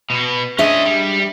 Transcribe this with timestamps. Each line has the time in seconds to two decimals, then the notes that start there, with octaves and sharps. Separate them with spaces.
0.10 B2 B3
0.59 C#4 D4 G#4 D#5 E5
0.85 G3